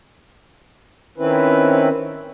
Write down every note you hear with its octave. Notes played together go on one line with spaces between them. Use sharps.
D#3 C4 C#4 E4 B4